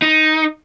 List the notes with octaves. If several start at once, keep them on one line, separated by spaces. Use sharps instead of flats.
D#4